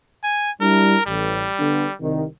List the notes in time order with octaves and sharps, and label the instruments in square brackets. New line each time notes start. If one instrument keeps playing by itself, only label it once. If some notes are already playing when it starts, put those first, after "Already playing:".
[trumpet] G#5
[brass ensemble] G3 D4 E4 [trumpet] A#4
[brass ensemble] A1 [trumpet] G3
[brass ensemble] D3 B3
C2 D#3